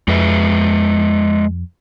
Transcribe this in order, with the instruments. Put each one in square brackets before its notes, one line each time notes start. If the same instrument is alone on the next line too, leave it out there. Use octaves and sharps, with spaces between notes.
[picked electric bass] F2 [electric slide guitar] G#3 B4 E5